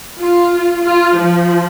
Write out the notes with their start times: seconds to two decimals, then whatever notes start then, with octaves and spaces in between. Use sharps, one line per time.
0.19 F4
0.83 F4
1.16 F3